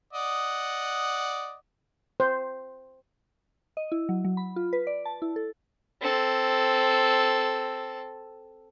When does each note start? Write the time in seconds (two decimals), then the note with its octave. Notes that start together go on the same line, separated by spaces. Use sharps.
0.13 D5 D#5 F#5
2.20 C5
3.77 D#5
3.92 E4
4.09 F#3
4.25 F#3
4.37 B5
4.56 F4
4.73 B4
4.87 D5
5.05 A5
5.22 E4
5.36 A4
6.02 C4 A4